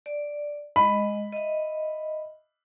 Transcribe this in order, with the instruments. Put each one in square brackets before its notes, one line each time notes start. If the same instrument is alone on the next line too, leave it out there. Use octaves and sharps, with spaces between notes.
[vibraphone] D5
[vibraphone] G#3 D#5 [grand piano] B5
[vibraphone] D#5 E5